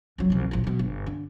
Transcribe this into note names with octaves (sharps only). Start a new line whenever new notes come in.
F#1 F#3
C2 F3
E1 A#1
B1 B2
G1
D3